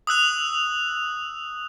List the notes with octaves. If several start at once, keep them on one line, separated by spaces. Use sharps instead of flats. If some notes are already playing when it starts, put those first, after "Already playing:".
D#6 E6 F#6 F7